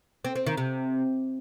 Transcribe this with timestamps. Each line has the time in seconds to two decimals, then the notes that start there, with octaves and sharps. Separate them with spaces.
0.25 C4
0.36 C4
0.46 D#3
0.57 C3